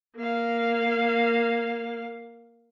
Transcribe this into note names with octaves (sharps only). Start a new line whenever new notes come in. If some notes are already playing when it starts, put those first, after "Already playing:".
A#3 F5